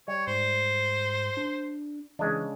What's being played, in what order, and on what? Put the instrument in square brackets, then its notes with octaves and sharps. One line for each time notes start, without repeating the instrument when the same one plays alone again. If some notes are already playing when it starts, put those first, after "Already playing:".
[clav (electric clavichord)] G3 [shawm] C#5
[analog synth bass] G#2 [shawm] C5
[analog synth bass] D4
[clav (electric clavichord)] C#3 G#3 D4 [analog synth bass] E3